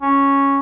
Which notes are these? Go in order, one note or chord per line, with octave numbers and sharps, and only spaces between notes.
C#4